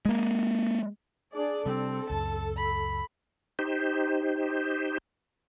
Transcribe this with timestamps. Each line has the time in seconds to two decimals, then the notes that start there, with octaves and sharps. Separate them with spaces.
0.05 G#3 A#3
1.34 D4 G#4 D5
1.66 C3 G3 C4 A4
2.10 C#2 F#2 A5
2.57 B5
3.59 D#4 G4 C5